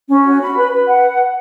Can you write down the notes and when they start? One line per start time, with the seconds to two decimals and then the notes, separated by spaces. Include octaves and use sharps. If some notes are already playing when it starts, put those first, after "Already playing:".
0.08 C#4
0.24 F#4
0.40 B5
0.57 B4
0.71 B4
0.87 F#5